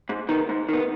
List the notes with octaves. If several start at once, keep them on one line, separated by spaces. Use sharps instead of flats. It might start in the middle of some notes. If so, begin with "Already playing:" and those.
G#2
D#3 B3
G#2
D#3 B3